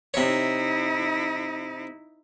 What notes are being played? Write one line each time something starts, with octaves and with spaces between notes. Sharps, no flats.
C3 D#4 E4 C#5